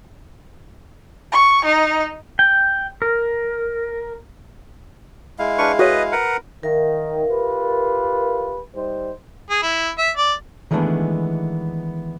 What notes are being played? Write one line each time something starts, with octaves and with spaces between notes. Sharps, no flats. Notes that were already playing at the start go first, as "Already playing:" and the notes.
C#6
D#4
G5
A#4
G#3 E4 F5
D4 G#4 B4 C#6 F6
F#4 G#4 B4 C#5 D#5
A#4 B4 F#5
D#3 A#4 E5 F5
F4 G4 B4
G3 D#4 C5
G#4
E4
E5
D5
D#3 E3 G#3 A3 B3 D4